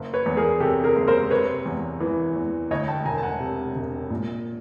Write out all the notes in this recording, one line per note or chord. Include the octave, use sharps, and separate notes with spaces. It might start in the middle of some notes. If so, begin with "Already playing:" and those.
Already playing: F#1
B4 C#5
E2
G#4 A#4
C3 G4 A4
G#4 A#4
F#1
A#4 C5
C3 B4 C#5
E2
E3
E2
D2 C#5 D#5
G5 A5
E1 G#5 A#5
A5
F#5 G#5
C3
E1
A#2